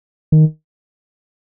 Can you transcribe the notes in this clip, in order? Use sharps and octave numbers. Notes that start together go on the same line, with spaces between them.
D#3